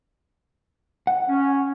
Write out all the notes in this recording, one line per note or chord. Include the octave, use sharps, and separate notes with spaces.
F#5
C#4